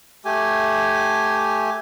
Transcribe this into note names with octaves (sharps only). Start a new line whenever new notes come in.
A3 G4 G#5